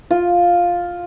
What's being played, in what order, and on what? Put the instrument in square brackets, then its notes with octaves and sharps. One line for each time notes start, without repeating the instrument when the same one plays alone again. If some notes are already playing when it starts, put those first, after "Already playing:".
[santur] F4